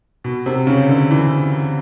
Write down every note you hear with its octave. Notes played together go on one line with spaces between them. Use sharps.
B2
C3
C#3
D3
E3